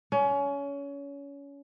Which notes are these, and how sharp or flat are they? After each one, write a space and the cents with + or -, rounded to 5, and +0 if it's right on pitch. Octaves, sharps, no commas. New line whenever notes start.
C#4 +25